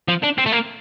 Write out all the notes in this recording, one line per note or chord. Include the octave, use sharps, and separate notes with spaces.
F3
D4
C4
A3
A#3